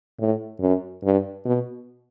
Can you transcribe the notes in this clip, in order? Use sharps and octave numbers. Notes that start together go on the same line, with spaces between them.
A2
F#2
G2
B2